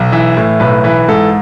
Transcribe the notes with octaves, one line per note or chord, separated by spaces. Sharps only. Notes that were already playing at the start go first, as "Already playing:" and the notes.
Already playing: B1
E3 E5
A2
B1 B4
E3 B4
G#2 A4